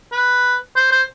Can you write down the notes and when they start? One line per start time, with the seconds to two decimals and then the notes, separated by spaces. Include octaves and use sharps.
0.12 B4
0.76 C5
0.92 C5